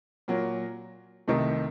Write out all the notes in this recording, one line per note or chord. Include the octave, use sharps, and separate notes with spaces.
A#2 F#3 A#3
C2 C3 D#3 A3 D#4